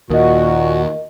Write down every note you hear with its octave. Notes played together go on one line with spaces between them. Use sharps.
D#2 A#2 F#4 A#4 D#5